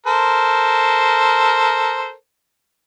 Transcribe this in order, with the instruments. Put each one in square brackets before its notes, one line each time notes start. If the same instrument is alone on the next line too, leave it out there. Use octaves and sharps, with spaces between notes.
[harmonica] A4 A#4 C5